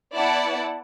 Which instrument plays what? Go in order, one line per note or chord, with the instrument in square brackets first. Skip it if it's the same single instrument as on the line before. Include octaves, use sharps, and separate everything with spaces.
[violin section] B3 E4 D5 F#5 A5